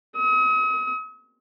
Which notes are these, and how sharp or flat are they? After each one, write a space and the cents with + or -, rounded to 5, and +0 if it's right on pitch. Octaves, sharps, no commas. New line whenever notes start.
D#6 +40